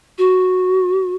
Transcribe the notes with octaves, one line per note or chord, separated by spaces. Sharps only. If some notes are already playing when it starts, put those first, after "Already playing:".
F#4